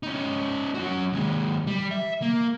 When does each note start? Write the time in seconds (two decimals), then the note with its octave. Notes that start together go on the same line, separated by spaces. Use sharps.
0.03 C#4 D#4
0.75 C#4 F#4
1.13 D#2 G#3
1.67 G3
1.91 E5
2.22 A#3